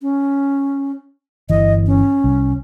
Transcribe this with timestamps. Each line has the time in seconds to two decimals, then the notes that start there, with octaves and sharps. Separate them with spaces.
0.02 C#4
1.50 G1 E3 D#5
1.86 C#4
2.24 C2